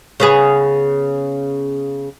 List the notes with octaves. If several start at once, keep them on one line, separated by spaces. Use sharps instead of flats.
C#3 B3 G#4